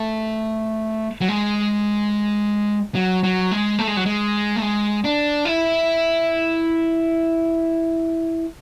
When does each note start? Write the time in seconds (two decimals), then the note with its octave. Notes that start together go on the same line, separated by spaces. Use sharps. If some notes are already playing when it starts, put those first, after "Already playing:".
Already playing: A3
1.21 F#3
1.28 G#3
2.95 F#3
3.23 F#3
3.51 G#3
3.79 A3
3.87 G#3
3.97 F#3
4.06 G#3
4.56 A3
4.62 G#3
5.04 D4
5.45 E4